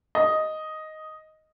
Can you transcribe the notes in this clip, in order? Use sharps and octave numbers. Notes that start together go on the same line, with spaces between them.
D#5